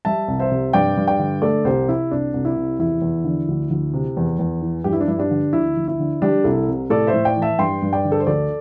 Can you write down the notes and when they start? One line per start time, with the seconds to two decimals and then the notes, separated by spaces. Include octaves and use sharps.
0.05 G3 E5 A5
0.28 C2
0.39 C5 E5
0.51 C3
0.73 G2 D5 G5
0.97 G2
1.07 D5 G5
1.19 D3
1.42 A3 A4 D5
1.65 C2 G4 C5
1.88 C3 E4
2.11 C2 D4
2.34 C2
2.45 E4
2.56 C3
2.79 E2 E4
3.02 E2
3.24 D3
3.48 D2
3.70 D2
3.94 C3
4.17 E2
4.39 E2
4.61 E3
4.84 G2 G4
4.93 E4
5.01 D4
5.08 G2 E4
5.18 D4 G4
5.31 D3
5.53 D2 E4
5.77 D2
5.88 E4
6.00 D3
6.22 G3 D4 G4
6.44 C2 E4 A4
6.68 C3
6.90 A2 A4 D5
7.07 C5 E5
7.14 A2
7.25 D5 G5
7.36 E3
7.42 E5 A5
7.59 G2 G5 C6
7.82 G2
7.93 D5 G5
8.05 D3
8.12 A4
8.20 C5
8.27 D2 A4 D5